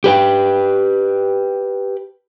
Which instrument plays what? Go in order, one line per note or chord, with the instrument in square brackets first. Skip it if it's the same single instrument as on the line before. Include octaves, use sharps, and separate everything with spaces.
[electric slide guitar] G4 B4 G5